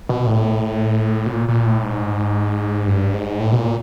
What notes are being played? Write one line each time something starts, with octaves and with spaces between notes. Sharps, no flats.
B2
A2
B2
A#2
A#2
A2
G#2
G2
G#2
A2
B2
A#2